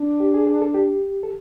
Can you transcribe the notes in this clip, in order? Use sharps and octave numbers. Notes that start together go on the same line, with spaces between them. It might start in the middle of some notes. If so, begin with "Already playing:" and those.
Already playing: D4
G4
G#4
G#4
A4
G4
A4